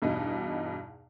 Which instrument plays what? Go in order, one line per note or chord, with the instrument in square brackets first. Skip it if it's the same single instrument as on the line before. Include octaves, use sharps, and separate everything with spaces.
[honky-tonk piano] E2 G2 B2 D#4